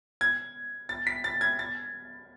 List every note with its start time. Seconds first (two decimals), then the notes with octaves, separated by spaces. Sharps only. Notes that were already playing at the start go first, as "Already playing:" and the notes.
0.21 G#6
0.89 A6
1.07 B6
1.24 A6
1.41 G#6
1.59 A6